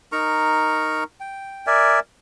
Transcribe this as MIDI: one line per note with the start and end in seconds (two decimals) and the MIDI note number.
0.12 1.04 63
0.12 1.04 70
0.12 1.04 82
0.12 1.04 85
1.20 1.66 79
1.67 2.00 70
1.67 2.00 74
1.67 2.00 76
1.67 2.00 80